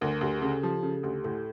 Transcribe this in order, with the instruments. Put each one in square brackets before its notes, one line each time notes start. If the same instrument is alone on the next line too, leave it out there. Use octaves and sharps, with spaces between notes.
[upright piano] D2 [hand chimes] A#4
[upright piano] D2 [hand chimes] G4
[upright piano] C#3 [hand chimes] A4
[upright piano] F3 [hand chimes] G4
[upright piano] C#3 [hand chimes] A4
[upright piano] D2 [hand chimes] G4
[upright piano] A2 [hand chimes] A4